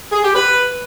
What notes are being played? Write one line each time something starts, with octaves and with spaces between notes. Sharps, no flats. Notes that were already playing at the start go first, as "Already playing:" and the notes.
G#4
G4
B4